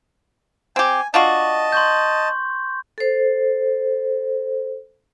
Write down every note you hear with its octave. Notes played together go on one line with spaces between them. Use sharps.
C4 G4 G#5
D4 F4 F#4 D#5 A5
C6 C#6 G6
A4 C5